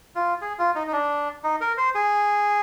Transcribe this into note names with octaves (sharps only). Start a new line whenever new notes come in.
F4
G#4
F4
D#4
D#4
D4
D#4
A#4
C5
G#4